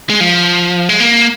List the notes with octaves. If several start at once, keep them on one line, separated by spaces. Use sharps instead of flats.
G#3
F3
G#3
A#3